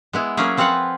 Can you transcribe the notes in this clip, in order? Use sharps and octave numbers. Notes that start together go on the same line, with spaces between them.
G#3 B3 E4
F#3 A#3 C#4 G#4
F3 C4 F4 B4 F#5